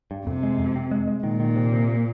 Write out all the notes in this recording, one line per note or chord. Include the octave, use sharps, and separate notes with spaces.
G2
F2 C3
G#3
F2
C4
G#3
G#3
A#2 D#3
D#3
C3
C3